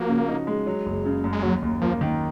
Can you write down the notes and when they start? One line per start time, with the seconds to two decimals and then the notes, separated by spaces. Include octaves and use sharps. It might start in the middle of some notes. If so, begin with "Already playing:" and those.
Already playing: F3 A#3 F#4
0.09 C#3
0.28 D#4
0.47 G#3
0.67 F#3
0.86 F#1
1.05 C#3
1.24 F#2
1.33 G#3
1.43 D#2 F#3
1.62 D#2
1.81 F3 A#3
2.01 D#3